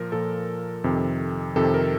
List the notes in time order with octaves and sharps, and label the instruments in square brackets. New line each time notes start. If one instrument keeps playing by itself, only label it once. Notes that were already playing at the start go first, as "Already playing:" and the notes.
Already playing: [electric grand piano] A#2 F3 A#4
A#2 F3 A4
F2 C3 D#3
F2 C3 D#3 A4
A#4